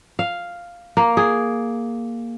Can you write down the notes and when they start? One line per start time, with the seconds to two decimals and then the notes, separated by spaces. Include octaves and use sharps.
0.19 F5
0.97 A#3
1.17 G#4